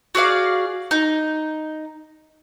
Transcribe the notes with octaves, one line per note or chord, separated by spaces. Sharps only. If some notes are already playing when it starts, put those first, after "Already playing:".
F#4 G#4 D5 F5
D#4